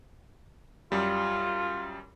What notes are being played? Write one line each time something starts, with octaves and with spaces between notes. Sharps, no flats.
F#2 G3 F4